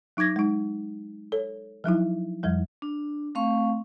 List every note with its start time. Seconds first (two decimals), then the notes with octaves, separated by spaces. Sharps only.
0.17 F#3 D#4 D6 G#6 A#6
0.36 G#3 D#4
1.32 A4 C#5
1.84 F3 F#3 D#4 E4
2.43 F2 F3 G3
2.82 D4
3.35 A3 C4 F5 C#6